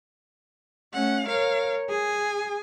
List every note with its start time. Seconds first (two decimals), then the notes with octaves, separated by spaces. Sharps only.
0.93 A3 C#4 F#5
1.28 A#4 C#5 F5
1.90 G#4 G#5